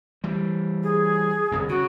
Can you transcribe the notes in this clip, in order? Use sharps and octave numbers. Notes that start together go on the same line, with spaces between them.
E3 G3
G#4
G1 C2 F2
C#3 F#4